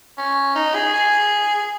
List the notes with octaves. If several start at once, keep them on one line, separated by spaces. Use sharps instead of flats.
C#4
D#4
G#4
G#4